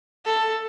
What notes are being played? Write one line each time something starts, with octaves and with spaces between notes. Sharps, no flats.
A4